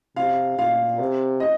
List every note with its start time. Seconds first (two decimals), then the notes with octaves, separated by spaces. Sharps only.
0.16 C3 F5
0.58 A#2 F5
0.99 C3
1.40 D#5